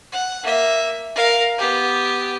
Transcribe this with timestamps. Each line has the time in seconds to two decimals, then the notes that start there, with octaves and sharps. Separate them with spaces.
0.12 F#5
0.44 A#3 E5
1.16 A#4 F5
1.58 B3 G4